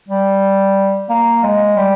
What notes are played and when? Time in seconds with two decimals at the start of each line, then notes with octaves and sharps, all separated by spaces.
0.08 G3
1.09 A#3
1.43 G#3
1.77 G3